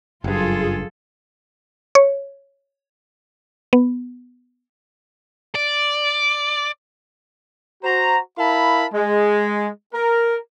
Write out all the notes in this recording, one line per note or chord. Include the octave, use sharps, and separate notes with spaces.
F#1 G2 F#3 F4 G#4 A4
C#5
B3
D5
F#4 C5 A#5
E4 A#4 F5 A5 B5
G#3
A#4